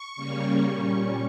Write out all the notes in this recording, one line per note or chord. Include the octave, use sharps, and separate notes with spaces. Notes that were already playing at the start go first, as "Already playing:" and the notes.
Already playing: C#6
C#3 G3 A#3 C#4
A#2 G3 C#4 C#6